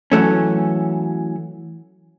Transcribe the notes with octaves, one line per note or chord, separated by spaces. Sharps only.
E3 F#3 A3 C#4